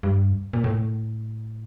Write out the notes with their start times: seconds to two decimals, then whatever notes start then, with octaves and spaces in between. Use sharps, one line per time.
0.03 G2
0.53 A#2
0.64 A2